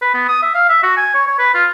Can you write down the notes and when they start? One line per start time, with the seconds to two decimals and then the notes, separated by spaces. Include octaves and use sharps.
0.02 B4
0.14 B3
0.29 D#6
0.43 E5
0.54 F5
0.69 E5
0.83 F#4
0.97 G#5
1.15 C#5
1.27 C#5
1.39 B4
1.54 F4